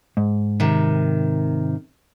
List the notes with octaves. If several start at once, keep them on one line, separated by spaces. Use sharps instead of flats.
G#2
C3 D#3